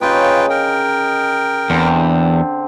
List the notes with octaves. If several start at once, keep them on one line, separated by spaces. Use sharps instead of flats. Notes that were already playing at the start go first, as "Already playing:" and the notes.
C#3 D#4 F4 B4 G5
A#4 G5
E2 D3 C4